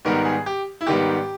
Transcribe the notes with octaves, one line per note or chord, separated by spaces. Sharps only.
G#2 D#3 G3 B3 A#4
G#4
G4
E4
G#2 D#3 G3 B3 G4